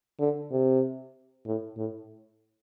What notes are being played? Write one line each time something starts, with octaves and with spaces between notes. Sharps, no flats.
D3
C3
A2
A2